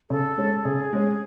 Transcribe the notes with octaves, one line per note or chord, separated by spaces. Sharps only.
C#3 A4
G#3 C#4
C#3 G#4
G#3 C#4